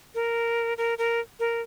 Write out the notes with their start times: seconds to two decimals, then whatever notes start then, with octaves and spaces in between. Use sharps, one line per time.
0.15 A#4
0.78 A#4
0.98 A#4
1.40 A#4